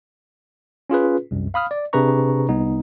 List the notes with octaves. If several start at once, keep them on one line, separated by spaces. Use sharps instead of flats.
C#4 F4 G#4 B4
C2 F#2
F5 B5 D#6 F6
D5
C3 D4 G#4 B4 A#5 C#6
C2 B3 D#4